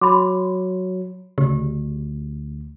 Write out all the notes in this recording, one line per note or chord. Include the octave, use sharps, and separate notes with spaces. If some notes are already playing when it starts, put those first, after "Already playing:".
F#3 B5 C6 D6
D2 C#3 G4